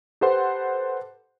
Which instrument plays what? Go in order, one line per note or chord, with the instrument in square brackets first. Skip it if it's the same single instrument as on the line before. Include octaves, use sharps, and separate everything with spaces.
[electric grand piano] G4 A4 B4 C5 F#5 C6